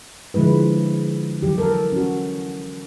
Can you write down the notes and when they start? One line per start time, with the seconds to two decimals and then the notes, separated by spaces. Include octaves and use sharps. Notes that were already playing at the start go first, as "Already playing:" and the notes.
0.34 D3 F3 G#3 E4 B4
1.43 E3 F#3 G4
1.58 A4 A#4
1.92 C#4 F#4